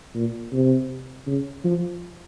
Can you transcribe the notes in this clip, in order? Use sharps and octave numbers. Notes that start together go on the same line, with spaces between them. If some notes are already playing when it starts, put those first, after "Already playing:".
A#2
C3
C#3
F3